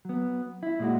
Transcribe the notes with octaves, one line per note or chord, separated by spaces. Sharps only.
F#3 B3
E4
A#2 G#3 F#4